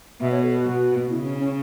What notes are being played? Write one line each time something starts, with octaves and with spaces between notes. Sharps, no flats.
B2 E5
C#5
A4
F#4
B2
C#3 E4
C#4
C#4